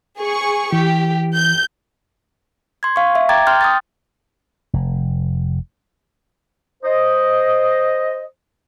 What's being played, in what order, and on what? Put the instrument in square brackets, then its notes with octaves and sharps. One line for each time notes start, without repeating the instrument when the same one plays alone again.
[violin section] G#4 C#6
[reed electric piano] E3 [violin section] G4
[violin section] G6
[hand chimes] C6 G#6
F5 C#6
E5
G5 A#5 D6 G#6 A6
G5 C6 F6 G6
D#6 A6
[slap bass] F1
[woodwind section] C5 D#5